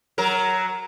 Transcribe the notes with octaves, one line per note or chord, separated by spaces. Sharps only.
F#3 A#4